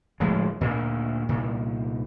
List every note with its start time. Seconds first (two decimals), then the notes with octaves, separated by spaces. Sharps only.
0.20 D1 A2 F3 G#3
0.61 D2 A#2
1.29 C2 A#2